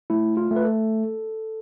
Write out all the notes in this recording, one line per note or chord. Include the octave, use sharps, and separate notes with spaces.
A3 E4
F4
A3
B4
A4